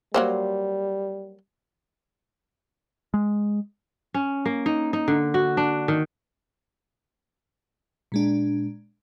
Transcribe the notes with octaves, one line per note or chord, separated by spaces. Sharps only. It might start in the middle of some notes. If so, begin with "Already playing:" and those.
F#3 G3 A#3 C5
G#3
C#4
A#3
D#4
D#4
D3
F#4
D4
D#3
A#2 G#3 D4